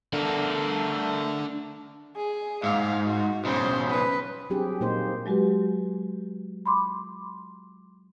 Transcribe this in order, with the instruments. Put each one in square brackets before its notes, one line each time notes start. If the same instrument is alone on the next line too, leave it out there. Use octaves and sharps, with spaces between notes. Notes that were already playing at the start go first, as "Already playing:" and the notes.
[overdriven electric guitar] A3 A#4 [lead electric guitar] D4 A4
[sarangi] G#4
[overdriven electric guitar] G#2 [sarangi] F5
[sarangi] F#4
[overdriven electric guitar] B1 C#3 [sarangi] C5
[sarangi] B4
[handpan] F#3 C4 D4 G4 G#4
A#2 A#3 D#4 C5
[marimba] F#3 G#3 F#4 G4 B4
B5 C6 D6